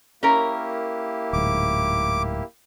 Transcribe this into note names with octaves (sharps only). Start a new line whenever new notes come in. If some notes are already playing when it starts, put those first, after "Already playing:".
A#3 C#4 E4 G4 A#4
D1 G#2 D6